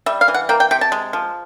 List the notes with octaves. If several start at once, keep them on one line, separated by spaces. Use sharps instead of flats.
G3 E5
F5
E3
F#5
A#3 G5
G5
C3 G5
A5
G#3
F3